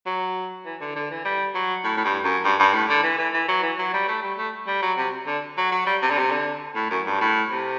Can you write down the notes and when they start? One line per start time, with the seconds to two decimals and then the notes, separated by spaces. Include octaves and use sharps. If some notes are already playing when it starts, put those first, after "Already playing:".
0.06 F#3
0.65 E3
0.81 D3
0.96 D3
1.11 E3
1.25 G3
1.55 F#3
1.84 A2
1.97 A2
2.04 G2
2.24 F#2
2.44 G2
2.60 G2
2.73 A2
2.89 D3
3.04 E3
3.18 E3
3.34 E3
3.48 F#3
3.63 E3
3.79 F#3
3.94 G3
4.08 A3
4.22 G3
4.38 A3
4.67 G3
4.82 F#3
4.98 C3
5.27 D3
5.57 F#3
5.72 F#3
5.86 G3
6.02 C3
6.11 D3
6.19 C3
6.31 D3
6.76 A2
6.90 F#2
7.06 G2
7.21 A2
7.51 C3